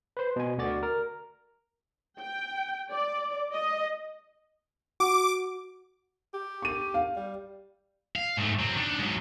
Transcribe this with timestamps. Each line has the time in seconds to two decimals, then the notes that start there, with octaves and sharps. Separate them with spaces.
0.17 B4 C5
0.36 B2 G#5
0.58 D2 D3 F#4 D5 A6
0.83 A#4
2.20 G5
2.92 D5
3.55 D#5
5.00 F#4 D6
6.34 G4
6.62 C#6 D#7
6.94 F5
7.16 G3
8.16 F5
8.37 G#2 A3
8.59 F#3 C4
8.77 D4 D#4
8.99 G#2 F#3